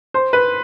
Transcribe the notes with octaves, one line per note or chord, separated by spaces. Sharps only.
C5
B4